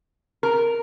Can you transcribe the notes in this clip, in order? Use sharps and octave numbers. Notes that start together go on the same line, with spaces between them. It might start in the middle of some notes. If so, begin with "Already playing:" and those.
A#4